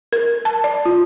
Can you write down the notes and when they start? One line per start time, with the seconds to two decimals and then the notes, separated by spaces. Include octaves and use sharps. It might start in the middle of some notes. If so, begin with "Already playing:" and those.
0.13 A#4
0.45 A5
0.64 D5
0.86 F4